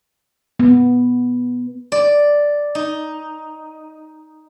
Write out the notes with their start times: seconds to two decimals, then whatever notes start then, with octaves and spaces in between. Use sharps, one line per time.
0.60 B3
1.92 D5
2.75 D#4